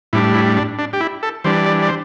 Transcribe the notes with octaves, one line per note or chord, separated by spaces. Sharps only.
A2 G3 D4 E4
E4
D4
D4
G4
E4
A4
E3 G3 D4 C5
D5
D5
C5